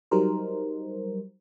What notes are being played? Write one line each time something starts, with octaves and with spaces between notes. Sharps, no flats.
F#3 G3 D#4 A#4 C5